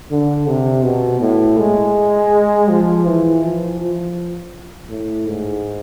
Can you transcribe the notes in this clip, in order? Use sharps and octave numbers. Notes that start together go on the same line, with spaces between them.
D3
C3
B2
A2
G#3
F3
E3
F3
F3
A2
G#2